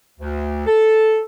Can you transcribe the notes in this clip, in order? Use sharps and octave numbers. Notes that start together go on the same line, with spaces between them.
D2
A4